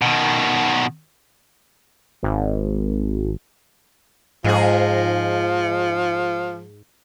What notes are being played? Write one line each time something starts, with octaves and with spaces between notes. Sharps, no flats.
B2 D#3
G#1
F2 G#2 F3 G#4